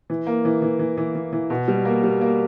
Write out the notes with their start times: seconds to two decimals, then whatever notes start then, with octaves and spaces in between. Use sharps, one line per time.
0.10 E3
0.27 A#3
0.45 E3
0.62 E3
0.79 E3
0.98 E3
1.15 E3
1.33 E3
1.50 B2
1.68 G3
1.85 A#3
2.03 G3
2.21 A#3